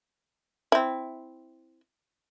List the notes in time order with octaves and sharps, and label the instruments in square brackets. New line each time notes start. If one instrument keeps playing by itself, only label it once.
[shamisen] C4 E4